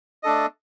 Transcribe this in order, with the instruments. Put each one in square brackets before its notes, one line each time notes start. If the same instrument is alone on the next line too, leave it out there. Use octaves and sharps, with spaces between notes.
[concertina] A3 D4 A4 D#5